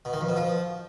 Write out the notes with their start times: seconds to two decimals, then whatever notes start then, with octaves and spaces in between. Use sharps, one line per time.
0.05 B2
0.13 D#3
0.21 F2
0.29 B2
0.36 F3